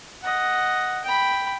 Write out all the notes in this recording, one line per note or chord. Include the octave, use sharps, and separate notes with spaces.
D#5 F#5
G5 B5